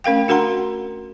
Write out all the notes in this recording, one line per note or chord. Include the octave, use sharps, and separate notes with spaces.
A3 C#4 A#4 F5 G5
D4 F#4 A#4 F#5 A#5 C6